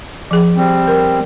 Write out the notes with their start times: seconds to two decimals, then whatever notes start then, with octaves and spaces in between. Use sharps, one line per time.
0.31 F3 G#4
0.55 G3 C4
0.87 A#4